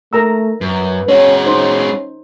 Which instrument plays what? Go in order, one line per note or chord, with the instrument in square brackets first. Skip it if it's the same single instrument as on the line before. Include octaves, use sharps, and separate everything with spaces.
[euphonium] A3 [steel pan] A#4 A#5 E6
[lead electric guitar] F#2 [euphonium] B4
[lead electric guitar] G#3 F#4 [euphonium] C#4 [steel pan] C#5
[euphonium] C#4 [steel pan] D#4 C5